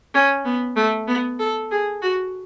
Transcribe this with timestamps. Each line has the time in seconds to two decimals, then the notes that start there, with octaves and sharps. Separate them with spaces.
0.14 C#4
0.45 B3
0.76 A3
1.08 B3
1.39 A4
1.71 G#4
2.02 F#4